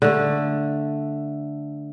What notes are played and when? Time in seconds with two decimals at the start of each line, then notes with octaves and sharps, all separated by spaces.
0.02 D3 A3